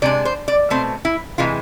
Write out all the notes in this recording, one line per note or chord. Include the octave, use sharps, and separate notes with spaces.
C3 G#3 D4 D5
C5
D5
B2 A3 C4 C5
E4
C3 E3 G#3 F4